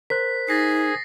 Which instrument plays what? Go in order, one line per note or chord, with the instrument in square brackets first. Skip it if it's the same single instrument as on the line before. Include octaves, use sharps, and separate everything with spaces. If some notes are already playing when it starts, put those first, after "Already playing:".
[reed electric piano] A#4 C5 F#6 [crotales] B6
[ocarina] D#4 [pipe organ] G#4 [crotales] A6 A#6 C7